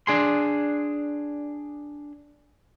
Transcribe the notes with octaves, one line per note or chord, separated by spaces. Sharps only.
D4 G#4 C6